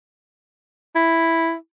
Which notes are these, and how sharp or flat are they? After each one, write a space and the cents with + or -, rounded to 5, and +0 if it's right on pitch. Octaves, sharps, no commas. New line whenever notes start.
E4 +0